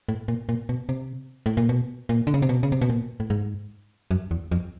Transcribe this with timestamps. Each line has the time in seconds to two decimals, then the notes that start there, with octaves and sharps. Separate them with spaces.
0.09 A2
0.28 A#2
0.49 A#2
0.69 B2
0.89 C3
1.46 A2
1.57 A#2
1.69 B2
2.09 A#2
2.27 D3
2.34 C#3
2.42 C3
2.49 B2
2.63 C#3
2.72 C3
2.81 B2
2.90 A#2
3.20 A2
3.30 G#2
4.11 F#2
4.31 E2
4.51 F2